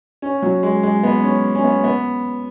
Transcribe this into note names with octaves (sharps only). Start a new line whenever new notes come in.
C#4
F#3
G#3
G#3
B3
C#4
C#4
B3
B3